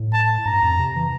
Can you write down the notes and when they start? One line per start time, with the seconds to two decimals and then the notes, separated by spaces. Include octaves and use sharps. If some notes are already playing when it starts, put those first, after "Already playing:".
Already playing: A2
0.13 A5
0.45 G2 A#5
0.62 F2
0.79 C3
0.96 E3